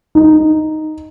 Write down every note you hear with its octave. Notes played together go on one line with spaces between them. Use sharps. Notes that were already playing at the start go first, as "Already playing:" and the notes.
D#4